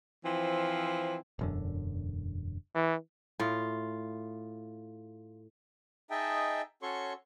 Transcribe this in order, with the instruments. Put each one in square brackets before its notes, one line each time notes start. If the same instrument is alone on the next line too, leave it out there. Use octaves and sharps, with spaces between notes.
[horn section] E3 F3 C4
[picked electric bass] E1 F#2 D3
[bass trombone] E3
[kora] A2 F4
[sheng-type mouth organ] D#4 G#4 D#5 E5 G5 A5
C#4 F#4 A4 C#5 C6 C#6